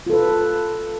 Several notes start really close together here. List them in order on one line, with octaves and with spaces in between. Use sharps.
F4 A4 B4